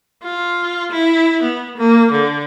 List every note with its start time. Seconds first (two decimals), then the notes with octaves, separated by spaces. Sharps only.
0.23 F4
0.92 E4
1.43 B3
1.77 A#3
2.12 D3